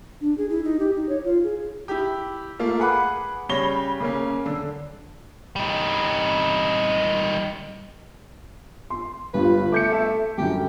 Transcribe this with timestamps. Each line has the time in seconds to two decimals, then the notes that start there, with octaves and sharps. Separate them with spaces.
0.21 D4
0.38 G#4
0.50 E4
0.64 D#4
0.79 G4
0.96 D#4
1.09 C#5
1.24 F4
1.44 G#4
1.88 E4 G4
2.59 A3 A#3 F4
2.79 G#4 B4 F#5 B5 D6 F#6
3.49 C#3 G3 C#5 B5 A#6 G7
4.00 C#3 A#3 C#4
4.46 D3
5.56 G3 D#4
8.90 C6
9.34 G1 G2 F4 B4
9.72 A3 D6 G6 C#7
9.92 E5 A5
10.38 F#2 D3 G3 G4